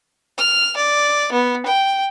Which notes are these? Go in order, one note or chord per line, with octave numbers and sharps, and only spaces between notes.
F6
D5
B3
G5